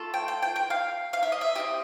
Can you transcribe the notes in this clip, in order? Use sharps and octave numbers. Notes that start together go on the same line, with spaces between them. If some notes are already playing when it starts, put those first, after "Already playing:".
Already playing: A3 F4 A4
G5
G5
G5
G5
F5
F5
E5
D#5
E5
C4 D#4 G4 D#5